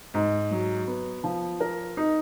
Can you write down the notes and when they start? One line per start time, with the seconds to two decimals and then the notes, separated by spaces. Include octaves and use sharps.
0.14 G#2
0.51 F#3
0.87 B3
1.24 F3
1.60 A#4
1.97 D#4